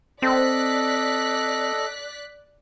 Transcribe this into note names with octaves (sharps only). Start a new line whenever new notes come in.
C4 A4 D5 D#5 F#6 B6